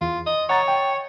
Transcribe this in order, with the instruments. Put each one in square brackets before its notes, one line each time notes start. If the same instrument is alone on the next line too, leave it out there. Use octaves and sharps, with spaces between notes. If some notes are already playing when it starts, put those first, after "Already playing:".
[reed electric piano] E2 [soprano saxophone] F4
[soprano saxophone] D#5
[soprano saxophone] C#5 [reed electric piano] F#5 A#5 A6
[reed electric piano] G5